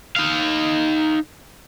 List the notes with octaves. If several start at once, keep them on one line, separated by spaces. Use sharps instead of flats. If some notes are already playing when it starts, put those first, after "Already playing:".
D#4 F5